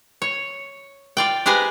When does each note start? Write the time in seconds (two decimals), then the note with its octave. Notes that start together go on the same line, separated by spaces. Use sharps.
0.22 C#5
1.17 F4 D5 G5
1.46 G#3 G4 B4 C5 G#5 A#5